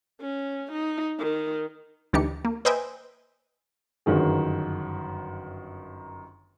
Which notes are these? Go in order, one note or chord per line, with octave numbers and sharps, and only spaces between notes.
C#4
D#4
D#3
D2 E3 D4 D#4 G4 C#7
A#3
B4 C5 D#5 E5 G5 G#5
G1 F#2 D#3 G#4